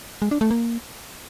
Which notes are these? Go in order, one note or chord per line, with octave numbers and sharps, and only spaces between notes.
G#3
D4
A3
A#3